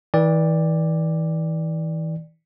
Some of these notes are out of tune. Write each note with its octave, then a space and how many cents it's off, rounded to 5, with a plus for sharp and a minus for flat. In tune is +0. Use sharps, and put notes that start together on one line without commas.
E3 -40 D5 +0 G5 +35